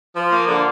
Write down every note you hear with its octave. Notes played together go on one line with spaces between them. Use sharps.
F3
A#3
D3